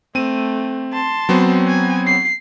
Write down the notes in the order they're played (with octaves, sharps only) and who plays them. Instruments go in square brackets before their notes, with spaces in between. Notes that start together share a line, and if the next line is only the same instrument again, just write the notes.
[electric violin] A3 [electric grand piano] C4 D#7
[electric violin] A5 C6
[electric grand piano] F#3 B3 C4
[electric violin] G#5
C7